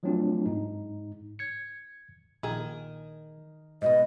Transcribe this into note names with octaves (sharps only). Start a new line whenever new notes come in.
F3 F#3 A3 C4 D4 F4
G#2 D#4
G#6 C#7
A#1 D#3 G#4
G#2 B2 B3 D#5